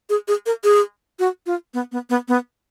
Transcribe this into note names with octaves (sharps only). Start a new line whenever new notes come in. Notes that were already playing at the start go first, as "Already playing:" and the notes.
G#4
G#4
A#4
G#4
F#4
F4
B3
B3
B3
B3